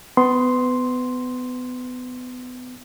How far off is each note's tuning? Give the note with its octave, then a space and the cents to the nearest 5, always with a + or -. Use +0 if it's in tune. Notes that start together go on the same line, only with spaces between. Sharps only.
B3 +25 C6 +0